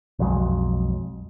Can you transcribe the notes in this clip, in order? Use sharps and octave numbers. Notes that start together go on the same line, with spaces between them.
B1 F2 F#3 G#3